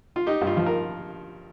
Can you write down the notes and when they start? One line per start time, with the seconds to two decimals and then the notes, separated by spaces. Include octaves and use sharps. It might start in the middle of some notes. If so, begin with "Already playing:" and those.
0.16 F4
0.26 D#4 G4
0.41 G2
0.47 F4
0.57 F3
0.66 A#4